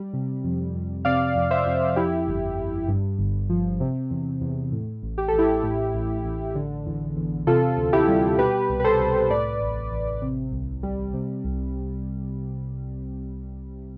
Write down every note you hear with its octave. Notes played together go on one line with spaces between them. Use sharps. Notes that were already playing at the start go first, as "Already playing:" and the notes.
Already playing: G3
C3
F2
F2
C3 D5 F5
F2
C5 E5
F2
F2 E4 G4
G1
G1
G2
G1
F3
C3
E2
E2
A2
A1
G4
A1 A4
E4 G4
A2
A1
A1
D3
E2
E2
C3 F4 A4
D2
E4 G4
G3
B2 G4 B4
C2
B4
A4 C5
C2
A2 B4 D5
A1
A1
C3
C2
G3
C3
C2